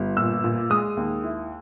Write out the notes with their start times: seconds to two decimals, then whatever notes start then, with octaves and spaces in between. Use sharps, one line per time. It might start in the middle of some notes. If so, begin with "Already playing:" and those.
Already playing: G1 G3
0.17 A#2 E6
0.44 A#2
0.70 G#3 D#6
0.97 D#2
1.24 E4